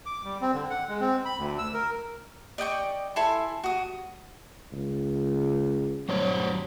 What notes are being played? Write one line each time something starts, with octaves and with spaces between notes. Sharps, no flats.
D6
G3
C4
D3
F#5
G#3
C4
B5
D2
E6
A#4
D5 D#5 G5 C#6
E4 A4 G#5 C6
F#4 D#6
C#2
G2 F#3 C5 C#5